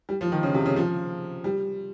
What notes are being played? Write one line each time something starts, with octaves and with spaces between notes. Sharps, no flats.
G3
F3
D#3
C#3
C3
C#3
F3
G3